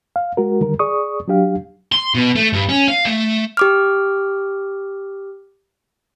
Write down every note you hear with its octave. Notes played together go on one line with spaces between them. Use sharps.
F5
G#3 F#4 A#4
D3 D#3 G3 A#4
G#4 D5 C#6 D#6
F#3 D4 G4 F5
C6
B2
A3
G2
C#4
F5
A3
G4 D6 F6